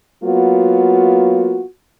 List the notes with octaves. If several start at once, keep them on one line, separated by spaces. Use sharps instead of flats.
F#3 A#3 B3 F4 F#4